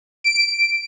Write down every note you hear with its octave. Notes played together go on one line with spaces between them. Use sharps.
D7